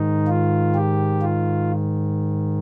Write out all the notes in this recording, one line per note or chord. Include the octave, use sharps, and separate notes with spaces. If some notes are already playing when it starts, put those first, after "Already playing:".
Already playing: G#2 D#3 D#4
F4
G4
F4